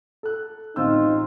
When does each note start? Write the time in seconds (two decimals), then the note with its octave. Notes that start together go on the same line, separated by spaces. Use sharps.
0.23 A4 F#6
0.76 A1 C4 D#4 F4 C5 E6